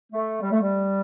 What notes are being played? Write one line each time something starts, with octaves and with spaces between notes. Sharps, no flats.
A3
G3
A3
G3